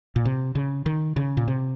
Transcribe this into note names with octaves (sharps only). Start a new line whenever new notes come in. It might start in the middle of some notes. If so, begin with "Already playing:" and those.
A#2
C3
C#3
D#3
C#3
A#2
C3